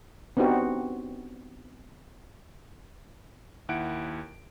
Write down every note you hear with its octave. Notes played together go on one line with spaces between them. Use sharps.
B3 C4 D4 D#4 F#4 G4
D#2 E4 F#5 D7